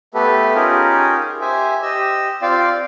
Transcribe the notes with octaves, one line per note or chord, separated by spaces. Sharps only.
A3 B3 G4 A4 B4
C#4 D#4 F4 G4 G#4 A#4
G4 C5 E5 G#5
G4 D#5 E6
C4 F4 D5 F5 G5